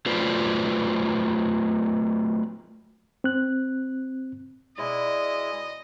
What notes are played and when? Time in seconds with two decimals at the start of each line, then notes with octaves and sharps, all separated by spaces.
0.06 F#3 A3 F4 B4 C5 D5
3.24 C4 F#6
4.78 B2 G#3 E4 D5 D#5